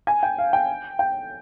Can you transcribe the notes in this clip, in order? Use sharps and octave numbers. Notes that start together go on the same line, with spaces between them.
G#5
G5
F5
G5
G5